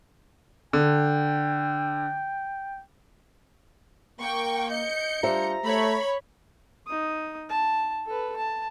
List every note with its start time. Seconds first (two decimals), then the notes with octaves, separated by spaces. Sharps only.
0.73 D3 G5
4.20 A#3 G5 C#6
4.71 D#5 G6 C#7
5.23 G3 D4 F4 G4 C5 E5 A#5
5.64 A3 C#5 B5
6.87 D#4 D#6
7.49 A5
8.06 A4 B4
8.37 A5